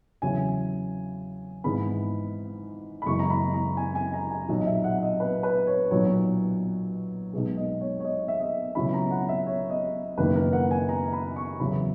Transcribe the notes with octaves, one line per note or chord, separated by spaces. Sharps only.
E2 C#3 F#3 C#4 E4 G#5
G#1 G#2 E3 G#3 B3 B5
B5
F#1 F#2 E3 G#3 C#6
A#5
B5
A#5
G#5
G#5
A#5
G#5
B1 A#2 F#3
D#5
E5
F#5
D#5
B4
B4
C#5
B1 A#2 F#3 B3 C#5
B1 B2 G#3
D#5
C#5
C#5
D#5
E5
D#5
C#2 B2 F#3 C#4 E4 B5
A#5
F#5
E5
C#5
D#5
F#1 F#2 D#3 A#3 B4
A#4
F#5
G#5
A#5
B5
C#6
E2 C#3 F#3 B3 E4 B5